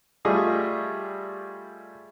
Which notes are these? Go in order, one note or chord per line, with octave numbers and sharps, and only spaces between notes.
G3 A3 F4 G#4 D5 D#5